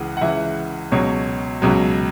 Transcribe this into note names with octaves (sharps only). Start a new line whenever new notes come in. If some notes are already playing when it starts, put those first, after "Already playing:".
Already playing: C#2 C#3 E3 F#5
F#5
C#2 C#3 E3 E5
C#2 B2 F#3 C#5
C#2 B2 F#3